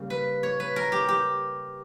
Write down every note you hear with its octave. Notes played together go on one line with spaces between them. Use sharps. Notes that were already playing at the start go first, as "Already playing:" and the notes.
Already playing: C#3 G3 A#3
B4
C#5
B4
A#4
G4
G4